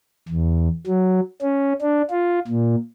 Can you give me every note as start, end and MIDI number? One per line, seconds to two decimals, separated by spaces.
0.28 0.68 40
0.87 1.20 54
1.42 1.73 61
1.82 2.02 62
2.10 2.39 65
2.47 2.75 46